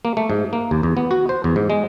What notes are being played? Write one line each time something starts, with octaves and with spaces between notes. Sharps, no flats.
A#3
A3
G#2
A#3
D#2
E2
B3
F#4
C5
E2
G#2
G#3